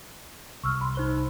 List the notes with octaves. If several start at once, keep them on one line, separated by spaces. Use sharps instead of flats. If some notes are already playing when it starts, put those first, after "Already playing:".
C2 C#6 E6 F6
B5 C6
D#4 C5 G7